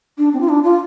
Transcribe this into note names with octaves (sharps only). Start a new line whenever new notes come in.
D4
C4
F4
D4
F4